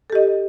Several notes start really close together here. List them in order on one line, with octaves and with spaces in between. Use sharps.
A4 G4 D#5